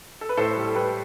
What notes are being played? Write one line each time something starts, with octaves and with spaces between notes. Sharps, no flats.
A4
B4
A2 A4 C5
G3
A4
A2 G4 B4